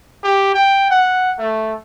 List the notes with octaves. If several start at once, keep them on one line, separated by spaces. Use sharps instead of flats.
G4
G5
F#5
A3